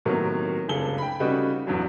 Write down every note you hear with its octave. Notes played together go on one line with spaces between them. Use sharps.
A2 C3 D#3 F#3 A#3 B3
F#1 C#2 G2 G#4 A4 G7
G5 B5
C#3 G3 A3 D#4 F#4 B4
A1 E2 G2 F#3